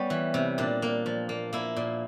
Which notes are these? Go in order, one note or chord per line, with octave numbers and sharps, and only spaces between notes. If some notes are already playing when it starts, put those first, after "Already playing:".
Already playing: G3 B3 C#4 G4
E3
C3
A#2 D4
A#3
F3
A#3
A#3 E4
A#2